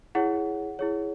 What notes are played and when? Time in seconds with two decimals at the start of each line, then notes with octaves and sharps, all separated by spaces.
0.15 E4 G#4 C#5 F#5
0.79 E4 G#4 C#5